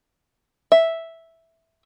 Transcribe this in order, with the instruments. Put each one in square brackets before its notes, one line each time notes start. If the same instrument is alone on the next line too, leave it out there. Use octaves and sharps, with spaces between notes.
[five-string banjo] E5